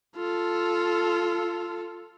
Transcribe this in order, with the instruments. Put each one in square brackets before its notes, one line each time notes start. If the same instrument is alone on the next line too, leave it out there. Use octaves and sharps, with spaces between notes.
[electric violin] F4 A4